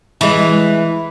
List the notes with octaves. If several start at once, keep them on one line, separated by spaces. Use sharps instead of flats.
E3 G#3